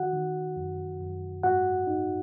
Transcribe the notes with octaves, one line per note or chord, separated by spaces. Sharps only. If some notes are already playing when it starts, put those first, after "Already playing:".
Already playing: D#3 F#4 F#5
D#3
F#2
F#2
G#2 F#4 F#5
D#4